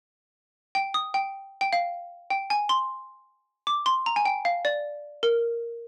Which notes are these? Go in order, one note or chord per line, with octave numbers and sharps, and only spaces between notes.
G5
D#6
G5
G5
F5
G5
G#5
C6
D6
C6
A#5
G#5
G5
F5
D5
A#4